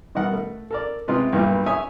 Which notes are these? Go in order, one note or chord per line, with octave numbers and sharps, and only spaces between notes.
B2 D#3 G3 A#4 F#5
A3
A4 A#4 D5
C3 G#3 F4 B4
B1 G2 A#2
C#5 E5 G#5 D#6